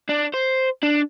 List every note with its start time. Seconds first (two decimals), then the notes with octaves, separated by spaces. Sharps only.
0.09 D4
0.34 C5
0.83 D4